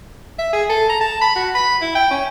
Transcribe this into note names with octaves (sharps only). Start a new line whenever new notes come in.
E5
G#4
A4
A#5
A5
B5
F#4
B5
E4
G5
C#4